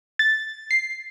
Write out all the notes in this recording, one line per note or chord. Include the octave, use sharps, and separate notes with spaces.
A6
C7